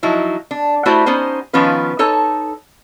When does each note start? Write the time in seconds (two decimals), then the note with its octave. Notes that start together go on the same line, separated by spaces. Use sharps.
0.03 F3 F#3 D#4 E4
0.51 D4
0.86 A3 E4 F#4 G4 C5 D5
1.06 B3 C#4 D#4 C5
1.53 D#3 F3 B3 C#4 F4 B4
1.99 D#4 A4 C#5 A5